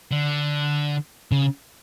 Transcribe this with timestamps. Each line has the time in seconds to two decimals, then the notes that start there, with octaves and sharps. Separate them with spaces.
0.11 D3
1.32 C#3